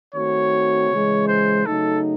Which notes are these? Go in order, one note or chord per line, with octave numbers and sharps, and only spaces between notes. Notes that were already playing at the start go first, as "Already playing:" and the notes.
D#3 A3 C4 F#4 C#5
C#3 E3 G#3
C5
C#3 F#3 A3 D#4 A4